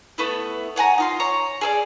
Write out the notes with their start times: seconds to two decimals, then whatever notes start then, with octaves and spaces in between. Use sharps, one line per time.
0.18 A3 B3 E4
0.76 C#5 F#5 G#5 A#5
0.98 D#4 F4 C6
1.20 C#5 A#5
1.61 G#4 A4 D5